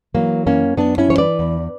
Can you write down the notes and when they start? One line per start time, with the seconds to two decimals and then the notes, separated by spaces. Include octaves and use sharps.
0.14 E3 F#3 A#3
0.46 F#2 A#3 C#4
0.77 F#2 B3 D4
0.98 C#4 E4
1.09 E3 C#5
1.18 B4 D5
1.39 E2